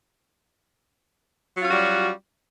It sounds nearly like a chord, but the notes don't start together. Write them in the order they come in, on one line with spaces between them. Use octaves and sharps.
F#3 F4 C#4 F#4 G3